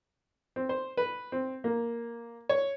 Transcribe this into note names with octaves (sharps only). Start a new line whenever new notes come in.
C4
C5
B4
C4
A#3
C#5